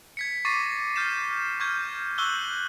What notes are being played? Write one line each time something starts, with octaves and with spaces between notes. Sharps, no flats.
G#6 B6 C#7
C#6 D6 A6 A#6 C7 D#7
F6 G6 A6 C7 E7
C#6 F6 G6 G#6
C#6 E6 F#6 G6 G7